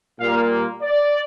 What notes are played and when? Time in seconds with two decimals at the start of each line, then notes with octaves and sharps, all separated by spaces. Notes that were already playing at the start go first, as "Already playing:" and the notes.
0.19 A#2 G3 A#3 F5
0.82 D5